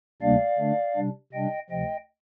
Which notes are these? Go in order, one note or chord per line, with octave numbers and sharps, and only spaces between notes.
D2 C3 G3 A#3 D4 D5 F5
D3 A3 D4
C3 G3 D4
C3 G3 D4 D#5 G5
D2 C3 F3 D#5 G5